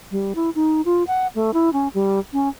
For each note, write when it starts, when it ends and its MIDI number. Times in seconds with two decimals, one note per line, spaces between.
0.11 0.33 55
0.35 0.50 64
0.55 0.81 63
0.85 1.03 65
1.07 1.27 78
1.35 1.51 57
1.54 1.72 64
1.73 1.88 61
1.94 2.19 55
2.33 2.49 61